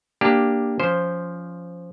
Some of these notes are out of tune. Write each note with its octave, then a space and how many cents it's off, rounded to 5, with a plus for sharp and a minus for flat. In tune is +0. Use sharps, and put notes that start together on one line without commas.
A#3 +0 D4 +0 G4 +5
F3 +0 C#4 +20 C5 +0